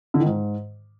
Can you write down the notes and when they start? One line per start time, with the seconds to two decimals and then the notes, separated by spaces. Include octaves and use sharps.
0.14 D3
0.20 D#3
0.26 G#2